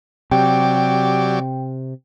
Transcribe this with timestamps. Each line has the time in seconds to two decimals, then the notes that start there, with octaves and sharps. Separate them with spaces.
0.31 C3 F#3 G4 D5 G5